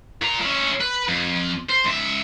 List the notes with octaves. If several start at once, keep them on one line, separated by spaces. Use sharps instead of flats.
A#2 A#5
C#4 E4
B4
F2
C5
C#2 E5